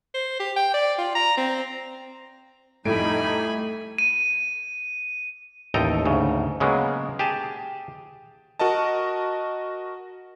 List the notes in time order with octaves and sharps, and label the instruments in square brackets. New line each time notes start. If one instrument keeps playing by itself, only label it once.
[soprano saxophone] C5
G4
G5
D5
F4
A#5
C4
[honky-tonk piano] F2 A2 D7 [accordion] G3 D#4 [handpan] A3 [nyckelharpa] G#5 B5
[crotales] D#7
[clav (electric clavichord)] A1 D#2 A4 D#5 G5 A#5
D2 G#2 C#3
C#3 F#3 G#3 A#3 B3
G4 G#4 A5
[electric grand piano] F#4 A#4 D#5 A5